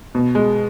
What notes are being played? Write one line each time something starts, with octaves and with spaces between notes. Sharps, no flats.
B2
G#3